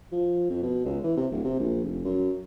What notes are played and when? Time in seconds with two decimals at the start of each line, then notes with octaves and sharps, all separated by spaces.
0.12 F3
0.50 F2
0.63 B2
0.85 C#2
1.04 E3
1.17 C3
1.32 D1
1.45 C3
1.59 A#1
1.84 F1
2.04 F#2